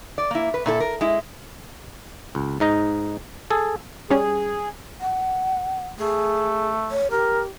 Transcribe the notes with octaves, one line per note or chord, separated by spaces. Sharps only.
D5
A#3 E4
B4
A#2 E4 A4
A#4
G#3 E4
C#2
G#2 D#4 D#5
G#4 A4
G3 C#4 G#4
F#5
A3 G#4
C#5
G4 A#4